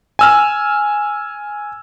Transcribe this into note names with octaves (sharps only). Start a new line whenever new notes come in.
G#5 E6 F6